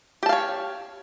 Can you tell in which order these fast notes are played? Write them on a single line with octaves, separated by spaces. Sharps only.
G4 A5 F5 C#5